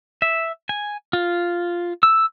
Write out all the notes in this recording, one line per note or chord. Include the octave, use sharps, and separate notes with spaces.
E5
G#5
F4
E6